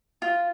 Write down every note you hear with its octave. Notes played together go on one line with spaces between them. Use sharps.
F4